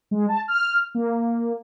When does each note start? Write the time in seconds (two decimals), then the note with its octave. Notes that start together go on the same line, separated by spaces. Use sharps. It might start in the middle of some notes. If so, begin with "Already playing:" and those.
0.11 G#3
0.28 A5
0.48 F6
0.95 A#3